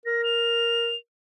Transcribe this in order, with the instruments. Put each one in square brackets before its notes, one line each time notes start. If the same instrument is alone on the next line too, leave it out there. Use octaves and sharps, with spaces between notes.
[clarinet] A#4 [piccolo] A#6
[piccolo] F7